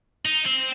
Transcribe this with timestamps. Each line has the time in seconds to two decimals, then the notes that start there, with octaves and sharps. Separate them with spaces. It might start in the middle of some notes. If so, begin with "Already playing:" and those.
0.25 D#4
0.46 C4